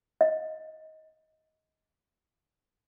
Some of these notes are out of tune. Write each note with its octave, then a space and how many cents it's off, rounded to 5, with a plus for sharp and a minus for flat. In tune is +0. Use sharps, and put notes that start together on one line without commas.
D#5 +20